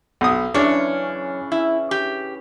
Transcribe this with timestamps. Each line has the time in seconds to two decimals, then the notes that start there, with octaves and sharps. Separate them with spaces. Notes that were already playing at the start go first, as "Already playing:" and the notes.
0.21 B1 D#6
0.54 F#2 C#3 E3 C#4 D4 C#5
1.52 E4
1.91 G4